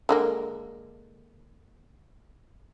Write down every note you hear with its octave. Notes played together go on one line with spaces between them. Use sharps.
D3 G#3 A#3